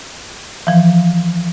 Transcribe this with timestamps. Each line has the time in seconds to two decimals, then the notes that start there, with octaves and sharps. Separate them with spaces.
0.67 E3 F3